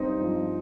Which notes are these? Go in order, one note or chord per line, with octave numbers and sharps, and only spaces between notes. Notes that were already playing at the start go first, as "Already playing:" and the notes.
Already playing: G2 C4 D#4
F3